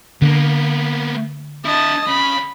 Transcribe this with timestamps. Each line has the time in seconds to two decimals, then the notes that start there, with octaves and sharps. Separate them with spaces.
0.22 D3 A#3 B3
1.65 D4 E4 D#5 A5
2.08 C#3 B5